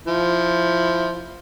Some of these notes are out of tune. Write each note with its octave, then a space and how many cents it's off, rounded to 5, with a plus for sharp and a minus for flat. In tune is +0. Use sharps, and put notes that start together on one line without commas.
F3 +0 E4 +0